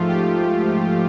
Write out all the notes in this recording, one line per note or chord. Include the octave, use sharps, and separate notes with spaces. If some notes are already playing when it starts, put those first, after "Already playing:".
Already playing: G#2 F3 A3 F4
G4